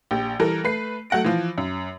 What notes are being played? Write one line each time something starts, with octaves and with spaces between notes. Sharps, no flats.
A#1 G4
E3 G3 A4 A#4
A3 B4 C7
F#3 A3 F#5 A#6 D7
E3 F3
F#2